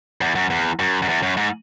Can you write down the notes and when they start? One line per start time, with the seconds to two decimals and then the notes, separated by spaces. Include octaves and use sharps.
0.21 E2
0.35 F#2
0.50 E2
0.79 F#2
1.02 F#2
1.08 E2
1.22 F#2
1.37 G#2